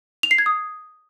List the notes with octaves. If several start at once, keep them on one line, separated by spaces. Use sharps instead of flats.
F7
C7
G#6
D#6